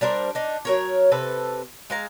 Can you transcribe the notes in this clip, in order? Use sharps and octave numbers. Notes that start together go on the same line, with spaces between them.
G3 D4 A#4 C5
D4 D#4
F#3 A#4 C#5
C3 A4 B4
G#3 F5 A#5